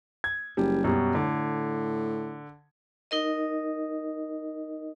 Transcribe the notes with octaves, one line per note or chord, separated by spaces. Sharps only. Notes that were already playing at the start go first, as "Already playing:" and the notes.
G#6
F#1 G3
F#2 B2 G3
A2 D3
D#4 A#4 D#5